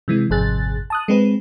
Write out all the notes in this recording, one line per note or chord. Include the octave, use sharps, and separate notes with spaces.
C3 E3 G#3
G#1 F2 C3 G#4 F#6 A6
A5 D#6 F#6
G#3 C4 B4